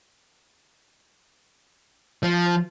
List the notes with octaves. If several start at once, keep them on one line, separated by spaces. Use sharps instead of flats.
F3